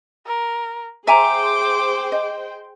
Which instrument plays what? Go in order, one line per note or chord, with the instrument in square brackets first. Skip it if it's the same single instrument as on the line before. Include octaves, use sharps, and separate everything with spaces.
[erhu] A#4
[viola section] G#4 C5 G5 [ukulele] E5 G#5 A#5 [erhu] D6
[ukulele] D#5